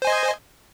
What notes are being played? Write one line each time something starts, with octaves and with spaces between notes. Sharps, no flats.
C5 D#5 G#5